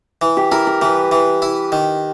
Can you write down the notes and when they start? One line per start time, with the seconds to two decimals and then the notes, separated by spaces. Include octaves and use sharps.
0.22 E3
0.37 G4
0.52 E4 A#4
0.67 A#4
0.82 E3 B4
1.11 E3
1.42 E4
1.72 D#3